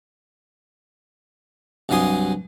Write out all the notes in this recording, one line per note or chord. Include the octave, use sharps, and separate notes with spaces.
C2 G2 F#3 G#5 C6 D#6